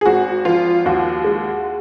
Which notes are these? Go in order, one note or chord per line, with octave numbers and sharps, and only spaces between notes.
G#4
G#1 F#4
F3 F4
D#2 F#4
G#3